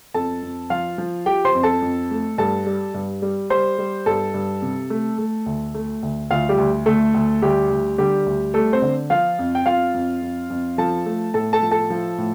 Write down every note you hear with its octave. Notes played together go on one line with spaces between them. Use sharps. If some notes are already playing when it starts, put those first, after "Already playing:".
F2 A4 A5
F2
F3 F4 F5
F3
F3 G4 G5
C5 C6
F2
A4 A5
F2
A3
G2 A4 A5
G3
G2
G3
G3 C5 C6
G3
G2 A4 A5
G2
C3
A3
A3
D2
A3
D2
D2 F4 F5
G3 G4
D2
D2 A3 A4
D2
D2 G3 G4
D2
D3 G3 G4
D2
G3 A3 A4
C4 C5
D3
F3 F4 F5
F2
G5
F2 F4 F5
F2
F2
F2
F3 A4 A5
A3
A2 A4 A5
A4 A5
F3
A4 A5
F3
A2